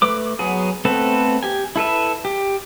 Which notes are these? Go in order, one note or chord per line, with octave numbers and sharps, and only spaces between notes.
A3 B4 D6
F#3 B3 G#4
A3 B3 C4 A4 B4
G4 G#5
E4 A4 B4 E5
G4